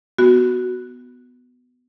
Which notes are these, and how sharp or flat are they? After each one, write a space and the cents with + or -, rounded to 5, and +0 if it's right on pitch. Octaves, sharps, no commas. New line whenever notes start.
B3 +10 F#4 +0